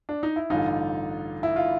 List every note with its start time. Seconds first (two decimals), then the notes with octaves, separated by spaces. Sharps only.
0.09 D4
0.23 D#4
0.36 E4
0.50 A1 G2 D3 D#4 F4
1.43 E4
1.56 F4